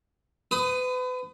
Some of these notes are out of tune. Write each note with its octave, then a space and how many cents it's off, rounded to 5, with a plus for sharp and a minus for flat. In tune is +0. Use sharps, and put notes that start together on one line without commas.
B4 +35 D#6 +0